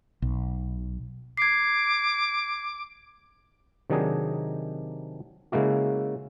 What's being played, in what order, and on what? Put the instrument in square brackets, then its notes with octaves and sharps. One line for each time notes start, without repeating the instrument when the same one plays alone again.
[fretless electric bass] B1
[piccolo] D6 [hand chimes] G#6 C7
[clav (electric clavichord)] C3 D#3 F#3 D4 D#4 G#4
C#3 G#3 A#3 E4 F#4